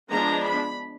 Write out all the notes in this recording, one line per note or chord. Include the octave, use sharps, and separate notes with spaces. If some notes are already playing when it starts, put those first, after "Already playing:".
F3 G#3 B3 D4 A#5
B5